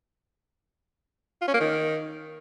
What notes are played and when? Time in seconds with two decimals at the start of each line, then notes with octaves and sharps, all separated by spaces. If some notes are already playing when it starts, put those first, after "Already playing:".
1.42 F4
1.48 C#4
1.54 A#3
1.60 D#3